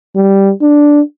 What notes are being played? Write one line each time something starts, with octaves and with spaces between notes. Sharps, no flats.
G3
D4